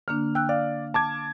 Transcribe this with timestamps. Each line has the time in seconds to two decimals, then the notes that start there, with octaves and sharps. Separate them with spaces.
0.08 D3 A#3 D4 F6
0.35 G5 E6 F#6
0.49 D5 F5
0.94 A5 D6 G#6